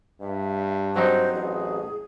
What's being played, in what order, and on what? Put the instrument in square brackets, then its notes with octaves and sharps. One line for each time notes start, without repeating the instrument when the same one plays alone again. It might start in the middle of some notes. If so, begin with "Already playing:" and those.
[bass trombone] G2 [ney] E5
[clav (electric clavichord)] F#3 C4 D#4 [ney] C5
[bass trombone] A1 [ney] G#4